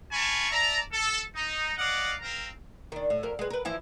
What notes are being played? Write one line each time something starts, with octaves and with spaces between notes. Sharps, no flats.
F4 G#5 A5 B5 C#6
D5 E5 A5 A#5
A4
D#4
D5 D#5 F5 F#5 D6
C4 A#4 F5 A#5
D#3 D4
A2
F2 A#4
G#3 B4
A#4 B4
E3 F3 E4